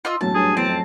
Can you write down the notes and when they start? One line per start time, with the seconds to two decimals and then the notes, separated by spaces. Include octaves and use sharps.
0.05 F4 D#5 E6
0.21 E1 F#2 A2 F#3 A5
0.35 G2 G#4
0.57 E2 C4 A5
0.68 F2